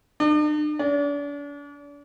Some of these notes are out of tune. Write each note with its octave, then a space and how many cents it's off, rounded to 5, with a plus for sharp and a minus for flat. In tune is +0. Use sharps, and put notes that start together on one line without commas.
D4 +45
D4 -40